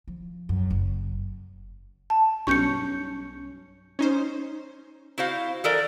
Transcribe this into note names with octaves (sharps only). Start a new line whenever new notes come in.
F3
F#2
F#1
A5
B1 G2 C#4 C#6 G6 C#7
C#4 D#4 C5
E4 F#4 C5 F5
E3 A4 A#4 D5